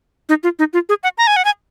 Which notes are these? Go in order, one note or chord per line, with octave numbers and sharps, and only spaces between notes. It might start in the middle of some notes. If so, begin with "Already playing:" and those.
D#4
F4
D#4
F4
G#4
F#5
A#5
G#5
F#5
G#5